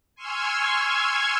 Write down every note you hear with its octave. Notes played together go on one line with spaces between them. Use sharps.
G#5 C6 C#6 E6 F6 G#6